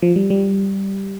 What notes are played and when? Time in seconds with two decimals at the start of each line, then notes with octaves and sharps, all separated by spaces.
0.02 F3
0.16 G3
0.30 G3